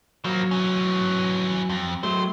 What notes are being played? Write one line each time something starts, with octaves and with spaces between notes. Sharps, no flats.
F3 F#3 A#3
E3 C#4
F2
F#3 A3 C5